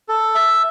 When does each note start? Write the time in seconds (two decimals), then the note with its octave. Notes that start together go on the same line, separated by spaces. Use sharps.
0.09 A4
0.35 E5